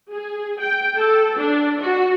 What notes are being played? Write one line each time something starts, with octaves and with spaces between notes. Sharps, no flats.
G#4
G5
A4
D4
F#4